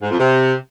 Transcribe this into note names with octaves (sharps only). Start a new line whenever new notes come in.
G#2
F2
C3